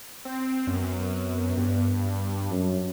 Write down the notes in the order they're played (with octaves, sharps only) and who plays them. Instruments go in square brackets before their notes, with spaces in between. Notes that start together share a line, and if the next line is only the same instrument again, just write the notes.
[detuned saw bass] C4
[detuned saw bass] F#2 [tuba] B3
[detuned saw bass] G2
[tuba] F#2